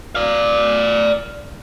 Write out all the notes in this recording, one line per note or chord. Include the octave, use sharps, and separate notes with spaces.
D5 F5